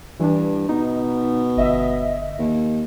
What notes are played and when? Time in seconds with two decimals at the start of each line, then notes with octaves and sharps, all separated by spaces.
0.20 G2 E3 D4
0.69 B2 D#4
1.57 G1 D#5 E5
2.38 D#2